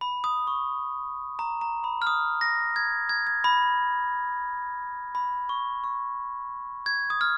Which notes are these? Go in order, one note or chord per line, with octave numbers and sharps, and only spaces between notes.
B5
D#6
C#6
A#5
A#5
B5
F6
D#6
A#6
G#6
G#6
G#6
B5
B5
C#6
C#6
G#6
D#6
F6